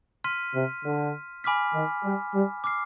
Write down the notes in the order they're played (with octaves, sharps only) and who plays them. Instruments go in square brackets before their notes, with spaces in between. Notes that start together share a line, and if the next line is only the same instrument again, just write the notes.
[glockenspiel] C6 F6 B6 D#7
[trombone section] C3
D3
[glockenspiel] G#5 B5 D6 F6 B6
[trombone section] D#3
G3
G3
[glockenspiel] D6 F6 C7